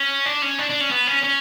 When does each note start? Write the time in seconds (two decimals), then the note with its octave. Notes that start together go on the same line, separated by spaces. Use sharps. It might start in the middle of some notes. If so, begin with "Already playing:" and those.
Already playing: C#4
0.26 D4
0.42 C#4
0.58 D4
0.70 D4
0.80 C#4
0.91 B3
1.07 C#4
1.23 C#4